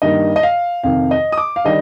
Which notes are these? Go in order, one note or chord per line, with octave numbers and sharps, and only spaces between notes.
G2 D#3 G3 A#3 D#4 D#5
D#5
F5
F2 C3 D#3 F5
D#5
D#6
D6
F5
D#3 G3 D4 D#5